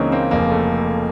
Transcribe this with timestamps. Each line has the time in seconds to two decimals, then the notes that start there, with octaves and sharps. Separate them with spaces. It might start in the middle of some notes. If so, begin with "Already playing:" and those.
Already playing: C#2 C#3 E3 A#3 C4 C#4 D#4
0.12 A#3 C4
0.31 F1 F2 C#3 F3 A#3
0.51 A3